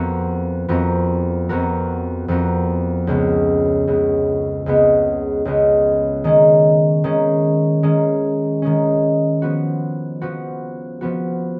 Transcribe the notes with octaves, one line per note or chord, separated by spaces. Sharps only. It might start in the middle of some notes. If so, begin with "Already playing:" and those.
Already playing: F2 F3 B3 F#4 A#4
F2 F3 B3 F#4 A#4
F2 F3 B3 F#4 A#4
F2 F3 B3 F#4 A#4
C#2 C#3 G#3 B3
C#2 C#3 G#3 B3
C#2 C#3 G#3 B3
C#2 C#3 G#3 B3
D#3 G#3 C#4
D#3 G#3 C#4
D#3 G#3 C#4
D#3 G#3 C#4
F3 B3 F#4
F3 B3 F#4
F3 B3 F#4